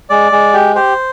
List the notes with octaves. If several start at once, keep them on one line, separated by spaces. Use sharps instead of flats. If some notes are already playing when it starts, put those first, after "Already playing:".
G#3 D5
G#3
G4
G4 C5